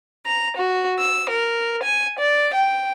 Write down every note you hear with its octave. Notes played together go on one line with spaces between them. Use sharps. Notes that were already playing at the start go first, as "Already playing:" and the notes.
A#5
F#4
E6
A#4
G#5
D5
G5